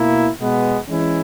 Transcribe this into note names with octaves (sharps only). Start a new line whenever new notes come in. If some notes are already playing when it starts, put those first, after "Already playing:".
Already playing: B2 A#3 E4
B2 G#3 B3
E3 G#3 C#4 E4